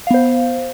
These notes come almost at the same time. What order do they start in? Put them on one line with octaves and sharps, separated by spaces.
F5 B3 C5